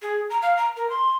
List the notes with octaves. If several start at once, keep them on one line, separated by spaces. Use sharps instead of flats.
G#4
A#5
F5
A#5
A#4
C6